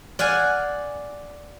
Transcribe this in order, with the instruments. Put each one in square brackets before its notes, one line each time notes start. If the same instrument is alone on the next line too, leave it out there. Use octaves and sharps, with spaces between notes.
[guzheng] D5 F5 F#5 G#5